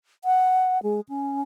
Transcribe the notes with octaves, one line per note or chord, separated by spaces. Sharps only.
F#5
G#3
C#4